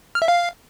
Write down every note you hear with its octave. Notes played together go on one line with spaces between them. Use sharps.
F6
E5
F5